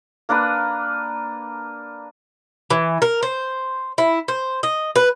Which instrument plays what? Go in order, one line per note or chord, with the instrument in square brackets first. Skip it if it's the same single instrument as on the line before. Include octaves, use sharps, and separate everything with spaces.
[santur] A#3 D4 A#4 B4
[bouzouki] E3
A#4
C5
E4
C5
D#5
B4